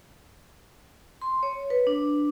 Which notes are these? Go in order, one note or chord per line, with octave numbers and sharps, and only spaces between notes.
C6
C#5
B4
D4